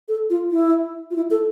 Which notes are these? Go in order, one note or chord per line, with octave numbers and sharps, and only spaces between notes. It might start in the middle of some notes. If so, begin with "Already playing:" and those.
A4
F4
E4
F4
E4
A4